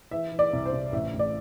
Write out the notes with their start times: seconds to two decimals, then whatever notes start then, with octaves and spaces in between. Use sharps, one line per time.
0.11 E3 E5
0.32 E3
0.39 D5
0.53 C2
0.66 C5
0.73 C3
0.92 A1 E5
1.14 A1
1.19 D5